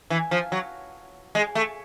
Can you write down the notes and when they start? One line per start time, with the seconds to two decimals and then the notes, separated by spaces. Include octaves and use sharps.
0.10 E3
0.31 F3
0.52 F#3
1.35 G#3
1.55 A3